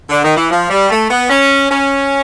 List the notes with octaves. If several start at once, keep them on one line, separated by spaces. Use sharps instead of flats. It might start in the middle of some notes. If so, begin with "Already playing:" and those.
D3
D#3
E3
F3
G3
A3
B3
C#4
C#4